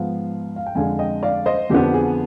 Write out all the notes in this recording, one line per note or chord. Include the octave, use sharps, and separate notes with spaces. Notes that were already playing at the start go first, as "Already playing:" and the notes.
Already playing: G#2 F3 B3 F5
F5
G5
F2 D3 G#3 F5 G#5
D#5 G5
D5 F5
C5 D#5
F2 D3 F3 B3 G4
G#4